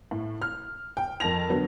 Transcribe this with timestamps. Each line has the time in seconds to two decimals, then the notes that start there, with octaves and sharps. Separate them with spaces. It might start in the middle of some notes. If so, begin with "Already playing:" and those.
0.11 A2
0.42 F6
0.97 G5
1.20 F2 A#4 A5 A#6 F7
1.49 D3 F#3 B3